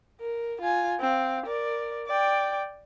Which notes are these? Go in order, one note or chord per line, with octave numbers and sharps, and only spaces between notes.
A#4
F4 G#5
C4 F5
A#4 D5
D5 G5